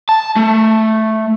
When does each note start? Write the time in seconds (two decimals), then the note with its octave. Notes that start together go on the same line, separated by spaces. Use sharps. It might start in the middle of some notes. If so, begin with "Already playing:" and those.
0.09 A5
0.36 A3